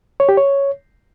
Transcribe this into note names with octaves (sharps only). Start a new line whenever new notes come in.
C#5
G4
C#5